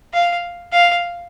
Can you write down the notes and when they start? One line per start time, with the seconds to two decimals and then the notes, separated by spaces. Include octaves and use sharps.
0.13 F5
0.72 F5